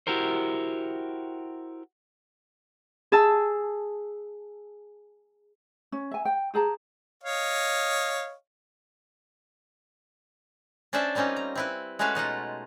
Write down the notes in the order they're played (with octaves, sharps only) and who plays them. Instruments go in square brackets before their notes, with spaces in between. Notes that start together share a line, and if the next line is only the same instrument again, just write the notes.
[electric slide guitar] E4 F#4 G4 A#4 C5
[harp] G#4 A5 E6
[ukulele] C#4
E5 G#5
G5
G4 G#4 A5 A#5
[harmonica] C#5 D#5 F5
[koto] C#4 D4 C5 D5 E5 A5
G3 A#3 C4 C#4 D#4 F4
A#5
C4 E4 B4
G#3 A3 C#4 F#4 B4 F5
B2 D#4 F4 F#5